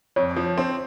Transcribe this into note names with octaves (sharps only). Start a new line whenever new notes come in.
F2 C#5
F3
C4